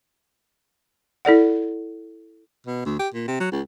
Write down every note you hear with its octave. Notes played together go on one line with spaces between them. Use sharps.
E4 A4 D5 F#5
B2
D2
G4
A#2
C3
F#3
C#2